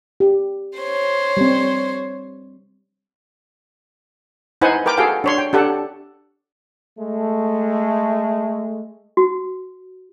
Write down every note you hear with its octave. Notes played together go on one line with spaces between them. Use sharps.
G4
C5 C#5
G3 C4
D#4 E4 B4 C5 F#5 G#5
A#4 B4 G5 D6
F#4 G#4 A4 F5 G5
D4 C#5 C6
G5
D4 G4 A4 F#5
G#3 A3
F#4